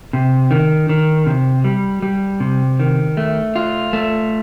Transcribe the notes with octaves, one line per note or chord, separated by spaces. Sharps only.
C3
D#3
D#3
C3
G3
G3
C3
D#3
A3
F4
A3